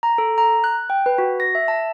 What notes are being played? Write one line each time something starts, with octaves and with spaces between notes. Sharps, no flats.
A#5
A4
A#5
F#6
G5
B4
F#4
A#6
E5
A5